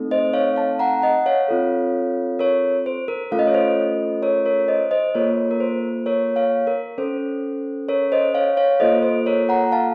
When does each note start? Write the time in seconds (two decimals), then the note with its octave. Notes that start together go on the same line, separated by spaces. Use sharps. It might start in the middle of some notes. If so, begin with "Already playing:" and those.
Already playing: A3 C4 D#4 A4
0.11 C5 D#5
0.33 C#5 F5
0.56 F5 A5
0.79 F#5 A#5
1.02 D#5 F#5
1.26 C#5 F5
1.48 C4 F4 A4
2.39 A#4 C#5
2.86 C5
3.08 A#4
3.31 A3 C#4 F4 A4 F5
3.39 D#5
3.47 C#5
3.54 C5 D#5
4.23 A#4 C#5
4.46 A#4 C#5
4.68 C5 D#5
4.91 C5 D#5
5.15 A#3 F4 A4 A#4 C#5
5.51 A#4
5.60 C5
6.06 A#4 C#5
6.36 C#5 F5
6.67 A#4
6.98 C#4 A4 C5
7.89 A#4 C#5
8.12 C5 D#5
8.34 C#5 F5
8.57 C#5 F5
8.80 A#3 F4 A4 C5 D#5
9.03 C5
9.26 A#4 C#5
9.49 F#5 A#5
9.72 F5 A5